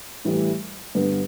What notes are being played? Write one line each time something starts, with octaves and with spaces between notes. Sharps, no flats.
A2 E3 G3 E4
G2 D3 B3